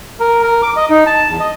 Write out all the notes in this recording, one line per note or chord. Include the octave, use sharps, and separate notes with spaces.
A#4
A#4
D6
D#5
D#4
A5
E2
D#5